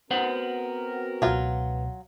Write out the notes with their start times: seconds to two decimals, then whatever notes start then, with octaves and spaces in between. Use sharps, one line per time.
0.11 B3 C4 F#4 A#4 C5 F#5
1.22 C#2 B2 F#3 F4